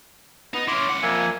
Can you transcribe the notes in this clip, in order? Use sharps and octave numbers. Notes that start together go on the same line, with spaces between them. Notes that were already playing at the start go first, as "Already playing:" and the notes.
B3 D#4
C#4 E4 C6 D6
C#2 F#5
F2 A#3 E5 G#5